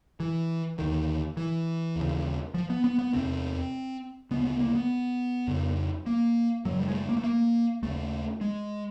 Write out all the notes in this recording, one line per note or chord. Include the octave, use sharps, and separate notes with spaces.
E3
D#2 D3 D#3
E3
D#2 C#3
F3
B3
B3
B3
E2 C3 C4
D2 C#3 B3
B3
A#3
B3
F2 C#3
A#3
F#2 C#3 F#3
G3
G#3
A3
A#3
A3
A#3
D#2 C#3 A3
G#3